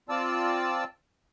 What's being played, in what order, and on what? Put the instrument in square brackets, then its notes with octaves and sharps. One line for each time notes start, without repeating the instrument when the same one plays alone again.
[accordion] C4 F4 D5 A5 E6